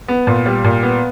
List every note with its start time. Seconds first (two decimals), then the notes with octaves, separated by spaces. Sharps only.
0.08 B3
0.27 A#2
0.46 G3
0.64 A#2
0.83 B3